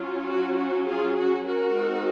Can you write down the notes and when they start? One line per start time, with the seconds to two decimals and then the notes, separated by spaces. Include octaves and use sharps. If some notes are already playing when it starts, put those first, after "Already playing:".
Already playing: F#3 C#4 F4
0.30 F#4
0.59 F#4
0.88 F4 G#4
1.17 F#4
1.46 F#4 A#4
1.75 G#3 C4 D#4